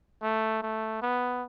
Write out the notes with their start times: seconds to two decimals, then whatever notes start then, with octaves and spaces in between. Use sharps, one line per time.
0.22 A3
0.62 A3
1.02 B3